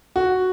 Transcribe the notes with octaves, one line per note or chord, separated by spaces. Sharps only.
F#4